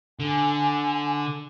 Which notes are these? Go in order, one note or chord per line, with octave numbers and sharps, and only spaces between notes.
D3 G#5